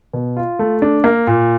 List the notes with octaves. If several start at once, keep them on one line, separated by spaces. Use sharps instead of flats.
B2
F4
A3
D4
A#3
A#2